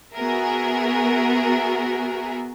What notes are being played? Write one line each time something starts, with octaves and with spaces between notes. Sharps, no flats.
B3 F#4 G#4 A#4 E5